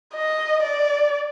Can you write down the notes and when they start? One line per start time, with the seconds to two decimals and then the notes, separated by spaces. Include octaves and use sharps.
0.16 D#5
0.63 D5